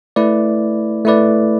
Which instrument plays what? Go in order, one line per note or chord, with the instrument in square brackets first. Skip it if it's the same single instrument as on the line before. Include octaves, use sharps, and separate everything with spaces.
[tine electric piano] A3 E4 B4 D5
A3 E4 B4 D5